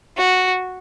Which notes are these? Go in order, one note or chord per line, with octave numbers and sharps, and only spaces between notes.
F#4